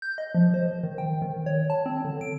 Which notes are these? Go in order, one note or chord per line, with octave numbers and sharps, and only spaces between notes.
G6
D#5
F3
C5
D#3
G5
D#3
C#5
A5
C4
D3
D7